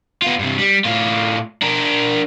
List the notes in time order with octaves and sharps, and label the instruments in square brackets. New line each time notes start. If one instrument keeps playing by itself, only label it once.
[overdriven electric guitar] B3 F4
G2 C3
G3
A2 F4
D4 A#4